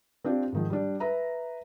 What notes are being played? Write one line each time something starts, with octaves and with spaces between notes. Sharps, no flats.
C4 D4 F4 G4
G#2 D#3 F3
G3 D4
B4 E5 A#5